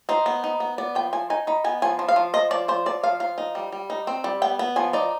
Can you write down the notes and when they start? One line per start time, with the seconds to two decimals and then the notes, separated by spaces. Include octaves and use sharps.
0.09 D#4 C5
0.26 B3
0.44 D#4
0.60 B3
0.78 B3 D5
0.95 F3 G5
1.13 F3 G#5
1.30 D#4 G#5
1.47 D#4 B5
1.64 B3 G#5
1.82 F3 G#5
1.99 F3
2.09 F5
2.16 F3
2.34 F3 D#5
2.51 F3 D5
2.68 F3 C5
2.86 F3 D5
3.03 F3 F5
3.20 F3 F5
3.38 D#4
3.55 G3
3.72 G3
3.90 D#4
4.07 C4
4.24 G3
4.42 B3 G5
4.59 B3
4.76 F3 G#5
4.93 D#4 D5